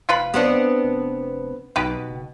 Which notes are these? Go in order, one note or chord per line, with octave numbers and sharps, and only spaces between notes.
F1 F4 B4 B5
B3 C4 D4
F1
B1 B2 D#4 G4 B4
F#1